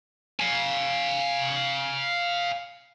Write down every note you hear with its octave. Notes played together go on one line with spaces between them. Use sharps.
F5 G#5